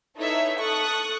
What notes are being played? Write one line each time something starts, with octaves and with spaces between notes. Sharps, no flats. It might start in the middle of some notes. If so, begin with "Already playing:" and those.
D#4 E4 A4 B4 C#5 E5
A4 C#6 D#6 F#6